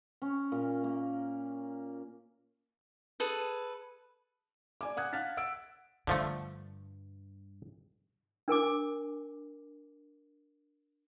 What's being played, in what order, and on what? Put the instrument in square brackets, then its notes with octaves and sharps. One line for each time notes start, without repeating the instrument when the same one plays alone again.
[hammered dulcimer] C#4
A#2
A#3
[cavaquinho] G#4 A4 B4
[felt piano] D5 G#5 D6
F#5 D#6 F#6 G#6
F5 F#5 F6 F#6 A6 B6
F#5 E6 D7
[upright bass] G2 [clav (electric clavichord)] D3 F3 A3
[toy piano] D4 A#4 G#5 D6